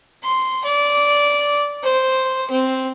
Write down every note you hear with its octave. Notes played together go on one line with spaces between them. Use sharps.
C6
D5
C5
C4